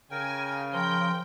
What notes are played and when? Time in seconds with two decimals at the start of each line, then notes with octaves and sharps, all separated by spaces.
0.11 C#3 A#4 G5 G#5
0.74 F3 A#4 G5 C6